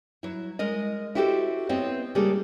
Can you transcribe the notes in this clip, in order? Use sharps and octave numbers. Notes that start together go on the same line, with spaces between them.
F#3 E4
G#3 A#4 D#5
E4 F#4 G4 A4 A#4 C5
B3 C4 E4 C#5 D#5
C#3 G3 G#3 A#3 G#4 A4